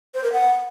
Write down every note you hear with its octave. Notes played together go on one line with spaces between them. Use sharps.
C5
A#4
F#5